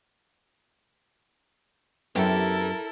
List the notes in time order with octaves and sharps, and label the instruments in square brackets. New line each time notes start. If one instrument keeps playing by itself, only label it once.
[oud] F#2 B3 G4 [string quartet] E4 A4 A#4